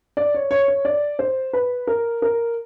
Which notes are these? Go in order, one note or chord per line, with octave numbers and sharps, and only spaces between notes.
D5
C#5
C#5
C#5
D5
C5
B4
A#4
A#4